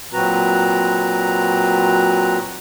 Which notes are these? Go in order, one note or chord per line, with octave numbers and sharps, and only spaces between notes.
A#2 F#3 C4 F#4 B4 A#5